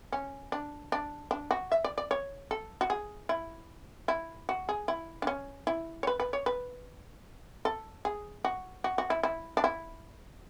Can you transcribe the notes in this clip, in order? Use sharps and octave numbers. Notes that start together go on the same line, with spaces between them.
C#4
D4
D4
D4
F#4
E5
D5
D5
C#5
A4
F#4
G#4
E4
E4
F#4
G#4
E4
D4
C#4
E4
C#5
B4
B4
C#5
B4
A4
G#4
F#4
F#4
F#4
E4
E4
D4
E4